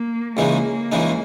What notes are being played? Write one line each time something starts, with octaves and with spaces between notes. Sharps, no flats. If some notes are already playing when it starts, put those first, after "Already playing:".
Already playing: A#3
C#2 C#3 E3 G#3 A#3 D#4
C#2 C#3 E3 G#3 D#4